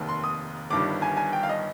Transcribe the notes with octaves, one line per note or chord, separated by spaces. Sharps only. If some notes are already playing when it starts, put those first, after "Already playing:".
Already playing: F1 D#2 D#3
C6
D#6
G1 G2 D#3 G3 D6
G#5
G#5
G5
F5
D#5